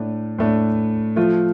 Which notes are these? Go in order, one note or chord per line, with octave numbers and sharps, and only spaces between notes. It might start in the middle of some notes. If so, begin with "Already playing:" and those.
Already playing: A2 A3 D4
A2 A3 D4
F3 A3 F4